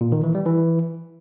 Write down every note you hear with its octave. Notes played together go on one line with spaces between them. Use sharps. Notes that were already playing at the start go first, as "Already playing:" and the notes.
A#2
D#3
E3
G3
E3